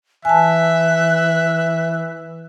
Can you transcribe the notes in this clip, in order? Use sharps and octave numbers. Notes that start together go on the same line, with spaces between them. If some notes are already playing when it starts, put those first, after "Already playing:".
E3 E5 G#5 A5 F#6